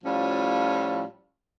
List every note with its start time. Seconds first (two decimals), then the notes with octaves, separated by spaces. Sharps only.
0.04 A2 F3 G3 C#4 F4